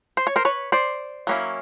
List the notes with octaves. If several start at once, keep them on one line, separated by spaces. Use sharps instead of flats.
C5
C#5
A#4 C5
B4 C#5
C5 D5
F#3 A#3 C#4 E4